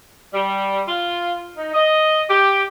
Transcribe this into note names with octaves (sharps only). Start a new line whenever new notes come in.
G3
F4
D#4
D#5
G4